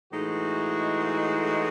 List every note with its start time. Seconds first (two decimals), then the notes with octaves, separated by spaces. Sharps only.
0.12 A2 E3 G#3 D#4 F#4